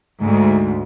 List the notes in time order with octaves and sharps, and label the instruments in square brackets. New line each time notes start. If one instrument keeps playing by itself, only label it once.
[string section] D2 G#2